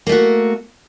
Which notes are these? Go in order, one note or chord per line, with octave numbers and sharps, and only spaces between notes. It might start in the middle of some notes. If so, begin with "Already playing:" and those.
A3 A#3 F#4